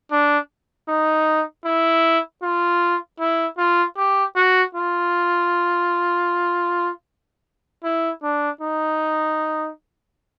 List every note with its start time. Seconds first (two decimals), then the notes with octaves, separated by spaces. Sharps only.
0.11 D4
0.88 D#4
1.65 E4
2.43 F4
3.20 E4
3.58 F4
3.98 G4
4.36 F#4
4.75 F4
7.84 E4
8.23 D4
8.61 D#4